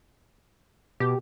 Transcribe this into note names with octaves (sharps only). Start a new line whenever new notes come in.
B2 G4